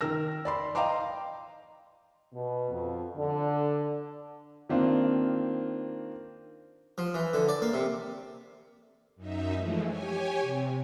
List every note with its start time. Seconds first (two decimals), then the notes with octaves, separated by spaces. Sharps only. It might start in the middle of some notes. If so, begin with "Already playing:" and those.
0.01 D#3 A#4 E6 A#6
0.45 D5 B5 C6
0.75 D#5 F5 G5 A#5 C6 D6
2.33 B2
2.70 F2
3.16 D3
4.69 D#3 A#3 C4 D4 F4
6.98 F3
7.14 E3
7.33 D3
7.49 D5
7.62 A#3
7.74 C3
9.16 F#2 D#4 E5
9.56 E3 F3 G#3 A3
9.86 G4 C#5 G#5
10.40 C3